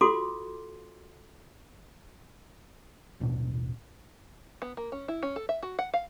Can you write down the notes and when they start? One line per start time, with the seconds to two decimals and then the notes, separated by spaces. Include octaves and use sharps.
0.01 F4 F#4 A4 C6 D6
3.20 D#1 A1 B2 D4
4.62 B3
4.77 A#3
4.92 C#4
5.08 E4
5.23 C#4
5.36 A4
5.49 E5
5.63 F#4
5.79 F#5
5.94 F5